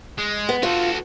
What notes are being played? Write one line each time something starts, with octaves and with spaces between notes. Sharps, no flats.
G#3
B3
F4 F#4 A4